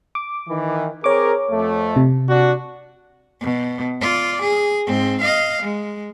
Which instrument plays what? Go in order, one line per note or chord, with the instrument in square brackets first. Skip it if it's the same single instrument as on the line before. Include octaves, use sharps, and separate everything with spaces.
[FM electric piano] D6
[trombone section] D#3 E3
[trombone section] C4 G#4 A#4 [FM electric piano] C#5 D6
[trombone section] F2 A3
[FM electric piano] C3
[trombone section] D4 F#4
[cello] B2
F4 D5
G#4
G#2 C4
D#5 F5
G#3